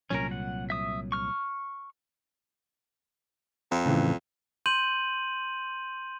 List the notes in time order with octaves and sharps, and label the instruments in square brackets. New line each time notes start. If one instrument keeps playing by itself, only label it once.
[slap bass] C2 A#2 F#3 [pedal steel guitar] C#4 A#4
[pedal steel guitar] F#5
E5 D#6
C#6 F6
[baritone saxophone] F2
[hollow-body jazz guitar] A2 C#3 E3
[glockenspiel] C6 G6 D#7 F#7